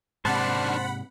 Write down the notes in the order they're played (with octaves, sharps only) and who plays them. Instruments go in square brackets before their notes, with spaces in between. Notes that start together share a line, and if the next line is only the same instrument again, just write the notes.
[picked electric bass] G#2 C3 [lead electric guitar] D#3 D4 [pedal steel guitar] C5 A5 [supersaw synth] F#5 B5